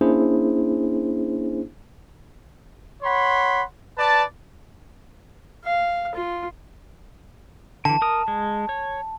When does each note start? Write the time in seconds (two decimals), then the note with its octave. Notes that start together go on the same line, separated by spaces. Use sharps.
0.01 A#3 C#4 D4 E4 G#4 C5
3.03 C#5 F#5 B5 C6
3.98 B4 D5 A5
5.65 F5
6.15 F4
7.85 D3 E3 A5
8.02 A#4 D#6
8.28 G#3
8.69 C#5